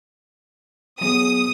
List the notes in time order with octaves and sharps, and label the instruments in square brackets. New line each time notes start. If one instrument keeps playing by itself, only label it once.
[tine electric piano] F#3 B3 G#4 [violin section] D#6